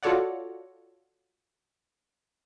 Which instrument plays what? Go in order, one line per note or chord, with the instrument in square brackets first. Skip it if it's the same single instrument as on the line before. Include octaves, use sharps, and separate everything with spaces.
[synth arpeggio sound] F4 F#4 A4 C#5 D5 F#5